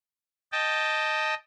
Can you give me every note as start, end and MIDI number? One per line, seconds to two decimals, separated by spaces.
0.52 1.34 75
0.52 1.34 79
0.52 1.34 81